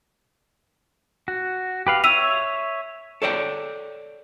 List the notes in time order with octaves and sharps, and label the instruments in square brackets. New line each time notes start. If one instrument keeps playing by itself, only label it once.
[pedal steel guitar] F#4
G4 B4 F5
[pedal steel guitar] C#5 E5 [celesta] E6 D#7 F7
[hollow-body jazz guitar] A4 C#5 D5 G5